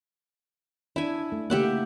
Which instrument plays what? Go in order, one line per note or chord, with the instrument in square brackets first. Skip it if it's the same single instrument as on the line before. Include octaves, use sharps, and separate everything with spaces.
[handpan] D4 [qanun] E4 G#5
[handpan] A3
[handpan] C#3 A3 A#3 [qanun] G4 E5 F#5